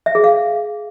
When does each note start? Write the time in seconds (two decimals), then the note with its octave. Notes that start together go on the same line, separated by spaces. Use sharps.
0.06 E5
0.15 G#4
0.24 F5